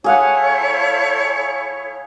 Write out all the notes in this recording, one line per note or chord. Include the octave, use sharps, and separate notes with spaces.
E4 G#4 A4 C#5 F5 F#5